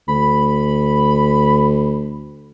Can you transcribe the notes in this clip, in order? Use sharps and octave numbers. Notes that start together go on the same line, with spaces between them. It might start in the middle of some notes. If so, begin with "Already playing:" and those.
D2 B5